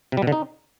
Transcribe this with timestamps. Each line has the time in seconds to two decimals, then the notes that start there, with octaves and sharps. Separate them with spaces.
0.12 C3
0.17 G3
0.22 B2
0.27 D3
0.32 D#4